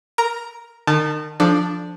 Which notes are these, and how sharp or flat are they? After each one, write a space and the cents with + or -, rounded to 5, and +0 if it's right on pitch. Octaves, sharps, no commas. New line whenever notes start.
A#4 +0 A#5 +5
D#3 -30 A5 +0
F3 +0 D4 +0 A4 +0